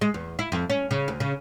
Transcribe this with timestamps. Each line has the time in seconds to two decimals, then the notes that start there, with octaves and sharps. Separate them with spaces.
0.01 G#3
0.14 E2
0.39 E4
0.52 F2
0.70 C#4
0.91 C#3
1.08 D2
1.20 C#3